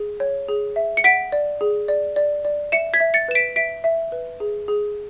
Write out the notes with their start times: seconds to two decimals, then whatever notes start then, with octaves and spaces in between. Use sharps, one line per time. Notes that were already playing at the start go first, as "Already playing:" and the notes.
Already playing: G#4
0.20 C#5
0.49 G#4
0.76 E5
0.97 C#7
1.04 F#5 B6 D7
1.32 D5
1.61 G#4
1.88 D5
2.16 D5
2.45 D5
2.72 E5 C#7 E7
2.94 G#6 B6
3.00 E5
3.14 A6 C#7
3.28 B4 E7
3.35 B6 D7
3.56 E5 B6 D7
3.84 E5
4.12 B4
4.40 G#4
4.68 G#4